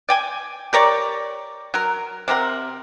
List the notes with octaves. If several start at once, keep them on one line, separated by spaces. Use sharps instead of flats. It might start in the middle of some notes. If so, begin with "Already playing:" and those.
D5 G5 G#5
G4 A#4 C#5 D5
F#3 A#4
C3 C4 A#4 F#5